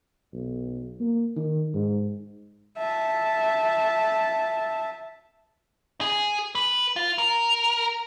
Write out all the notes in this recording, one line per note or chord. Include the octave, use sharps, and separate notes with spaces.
B1
A#3
D#3
G#2
E5 A5
G#4
B4
F4
A#4